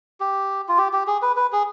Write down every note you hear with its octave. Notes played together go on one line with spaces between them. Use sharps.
G4
F4
G4
G4
G#4
B4
B4
G#4